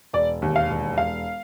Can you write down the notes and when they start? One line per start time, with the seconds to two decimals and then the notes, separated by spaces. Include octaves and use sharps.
0.13 E1 D5
0.42 D#2
0.56 F5
0.70 E1
0.98 E1 F5